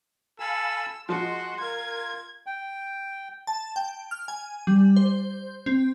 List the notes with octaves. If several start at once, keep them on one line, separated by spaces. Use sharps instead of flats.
A4 F5 G#5 B5 E6
F3 G#3 F#4 C6
F4 A#4 G#6
G5
A5
G5
F6
G#5
G3
C5
C4